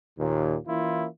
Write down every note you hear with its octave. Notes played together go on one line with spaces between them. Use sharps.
D#2 A#2
E3 A#3 C#4 E4 F4